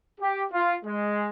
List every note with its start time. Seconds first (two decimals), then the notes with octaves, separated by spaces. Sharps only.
0.20 G4
0.52 F4
0.85 G#3